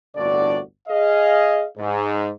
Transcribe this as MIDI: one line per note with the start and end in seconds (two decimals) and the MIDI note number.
0.16 0.60 31
0.16 0.60 36
0.16 0.60 45
0.16 0.60 50
0.16 0.60 66
0.16 0.60 74
0.88 1.65 68
0.88 1.65 75
0.88 1.65 77
1.78 2.31 44